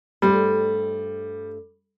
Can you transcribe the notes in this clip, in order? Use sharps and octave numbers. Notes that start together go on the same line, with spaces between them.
G2 G3 A3 C5